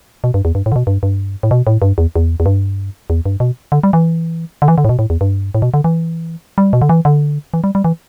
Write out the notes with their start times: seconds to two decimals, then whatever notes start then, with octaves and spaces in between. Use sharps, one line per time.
0.24 B2
0.34 G2
0.45 E2
0.55 G2
0.66 A2
0.72 D3
0.76 B2
0.87 G2
1.03 G2
1.43 A2
1.51 B2
1.67 A2
1.82 G2
1.98 E2
2.16 E2
2.40 E2
2.46 G2
3.10 E2
3.26 G2
3.40 B2
3.72 D3
3.83 G3
3.93 E3
4.62 D3
4.68 E3
4.78 D3
4.85 A2
4.89 B2
4.99 A2
5.10 E2
5.21 G2
5.55 A2
5.62 B2
5.74 D3
5.84 E3
6.58 G3
6.73 B2
6.82 D3
6.89 E3
7.05 D3
7.54 E3
7.64 G3
7.75 G3
7.84 E3